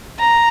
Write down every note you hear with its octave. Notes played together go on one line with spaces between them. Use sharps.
A#5